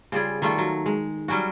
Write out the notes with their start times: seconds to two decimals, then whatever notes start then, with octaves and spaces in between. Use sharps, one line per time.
0.12 C#3 G3 F4 G#4
0.42 D#3 G3 A3 F4
0.58 F#3
0.86 G#3
1.28 F#3 G3 C#4 F#4